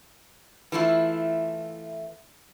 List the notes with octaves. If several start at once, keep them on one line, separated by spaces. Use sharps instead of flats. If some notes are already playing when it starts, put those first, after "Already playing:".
E3 A3 E4 F4